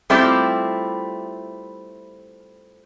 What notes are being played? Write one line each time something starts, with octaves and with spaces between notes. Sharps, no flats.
G3 A3 C4 E4 F4 G4